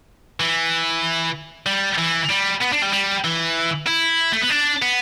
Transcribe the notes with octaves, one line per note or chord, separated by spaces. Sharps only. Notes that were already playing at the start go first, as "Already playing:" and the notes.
E3
G3
E3
G3
B3
D4
G3
G3
E3
E4
A3
B3
D4
B3